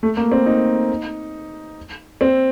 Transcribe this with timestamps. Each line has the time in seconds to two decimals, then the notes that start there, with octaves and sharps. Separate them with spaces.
0.03 A3
0.17 A#3
0.32 C4
0.46 D#4
2.21 C4